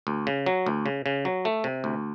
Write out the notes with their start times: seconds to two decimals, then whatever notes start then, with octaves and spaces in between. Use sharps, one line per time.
0.07 D2
0.27 C#3
0.46 F#3
0.66 D2
0.86 C#3
1.06 C#3
1.25 F#3
1.45 A3
1.64 C3
1.84 D2